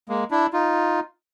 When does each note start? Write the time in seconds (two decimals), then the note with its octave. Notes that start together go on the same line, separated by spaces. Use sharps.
0.09 G#3 A#3
0.31 D4 E4
0.53 D#4 F4